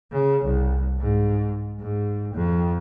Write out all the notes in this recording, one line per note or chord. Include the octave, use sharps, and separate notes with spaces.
C#3
C2
G#2
G#2
F2